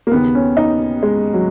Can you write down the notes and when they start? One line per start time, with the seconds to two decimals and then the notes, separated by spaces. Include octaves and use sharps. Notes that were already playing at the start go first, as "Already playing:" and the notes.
0.07 A#3
0.12 D#2 C#3 B3
0.35 C#4
0.57 D#4
1.03 G#3
1.34 F#3